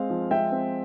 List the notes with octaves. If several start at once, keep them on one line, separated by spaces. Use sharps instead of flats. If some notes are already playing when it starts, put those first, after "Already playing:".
Already playing: G#3 C4 F5
F3
G#3 E5 G5
C4